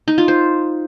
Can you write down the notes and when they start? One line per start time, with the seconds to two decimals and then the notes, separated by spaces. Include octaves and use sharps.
0.08 D#4
0.18 F4
0.28 C5